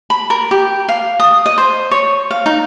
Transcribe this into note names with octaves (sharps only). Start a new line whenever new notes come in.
B5
A#4
G4
F5
D#6
D#5
C5
C#5
F5
D#4